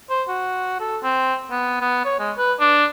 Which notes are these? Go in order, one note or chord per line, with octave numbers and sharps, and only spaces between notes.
C5
F#4
A4
C4
B3
B3
C#5
G#3
B4
D4